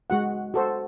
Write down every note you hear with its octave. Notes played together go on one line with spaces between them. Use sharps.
G#3 F#4 F#5
F#4 A4 C5